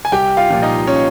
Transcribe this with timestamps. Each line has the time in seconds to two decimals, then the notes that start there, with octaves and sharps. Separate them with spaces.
0.05 G#5
0.12 C2 G4 G5
0.37 F4 F5
0.50 A#2 F3
0.62 D#4 D#5
0.87 C#4 C#5